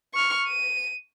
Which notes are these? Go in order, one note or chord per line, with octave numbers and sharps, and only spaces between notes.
C#6 F6
D#7